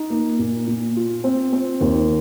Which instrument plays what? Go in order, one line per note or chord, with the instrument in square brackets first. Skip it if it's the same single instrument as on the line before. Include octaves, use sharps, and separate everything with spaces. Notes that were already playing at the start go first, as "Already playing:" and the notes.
Already playing: [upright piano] D#4
A#3
A#2
A#2
F4
C4
C4
D#2